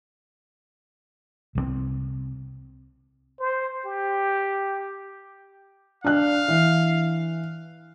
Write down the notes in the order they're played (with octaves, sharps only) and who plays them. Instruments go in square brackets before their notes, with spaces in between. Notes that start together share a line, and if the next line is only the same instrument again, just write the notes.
[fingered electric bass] C2 E3 C4
[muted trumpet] C5
G4
[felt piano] D4 F#6 [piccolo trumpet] F5
[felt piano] E3